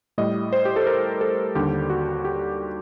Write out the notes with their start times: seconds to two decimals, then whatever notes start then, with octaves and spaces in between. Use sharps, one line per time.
0.18 A2 G3 D#5
0.53 C5
0.65 G4
0.76 A4
0.87 A#4
1.21 A4
1.55 D#2 D3 G3 G4
1.90 F#4
2.25 G4